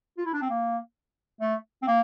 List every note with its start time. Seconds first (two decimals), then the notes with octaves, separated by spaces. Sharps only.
0.18 F4
0.25 E4
0.33 D4
0.42 C4
0.50 A#3
1.41 A3
1.83 C4
1.88 A#3